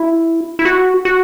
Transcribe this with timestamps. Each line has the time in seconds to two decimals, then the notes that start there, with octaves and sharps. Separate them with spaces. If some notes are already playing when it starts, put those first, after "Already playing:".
Already playing: E4
0.59 E4
0.65 F#4
1.05 F#4